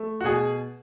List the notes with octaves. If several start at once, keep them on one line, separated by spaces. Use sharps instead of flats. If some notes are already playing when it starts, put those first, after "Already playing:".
Already playing: A3
F#4
B2 G#4